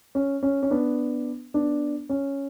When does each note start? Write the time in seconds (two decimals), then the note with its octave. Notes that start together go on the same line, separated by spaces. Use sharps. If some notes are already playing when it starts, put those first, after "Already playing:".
0.15 C#4
0.43 C#4
0.63 C#4
0.71 B3 D4
1.54 B3 D4
2.09 C#4